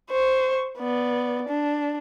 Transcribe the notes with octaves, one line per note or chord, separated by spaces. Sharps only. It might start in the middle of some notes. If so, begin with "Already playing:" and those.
C5 C#6
B3 D5
D4